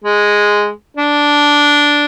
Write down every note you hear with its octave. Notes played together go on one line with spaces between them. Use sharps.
G#3
D4